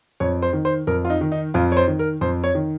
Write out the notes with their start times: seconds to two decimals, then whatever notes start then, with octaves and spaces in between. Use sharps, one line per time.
0.20 F2 C#5
0.42 C5
0.53 D#3
0.65 C5
0.87 F2 A#4
1.05 F4
1.10 D#4
1.21 D#3
1.32 D#4
1.54 F2 F4
1.72 C#5
1.77 C5
1.88 D#3
1.99 A#4
2.21 F2 C5
2.44 C#5
2.55 D#3